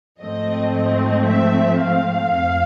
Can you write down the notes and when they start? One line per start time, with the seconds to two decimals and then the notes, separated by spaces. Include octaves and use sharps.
0.21 G#2 F3 A3 C4 D#5
0.74 D#5
1.27 E5
1.81 F5
2.35 F2